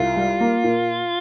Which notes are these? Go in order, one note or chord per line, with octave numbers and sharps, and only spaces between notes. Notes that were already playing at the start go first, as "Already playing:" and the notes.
Already playing: C2 F4
G3
A#3
A#2